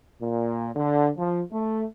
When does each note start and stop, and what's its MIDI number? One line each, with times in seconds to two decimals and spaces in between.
0.22 0.70 46
0.75 1.09 50
1.17 1.42 53
1.52 1.85 57